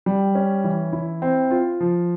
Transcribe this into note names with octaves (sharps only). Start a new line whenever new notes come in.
G3
C#4
E3
E4
C4
F4
F3